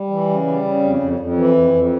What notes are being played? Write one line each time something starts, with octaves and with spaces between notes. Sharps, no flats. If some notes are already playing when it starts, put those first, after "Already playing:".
Already playing: G3
E3
C#3
G3
C#3
F2
F2
F2
E3
F2
F2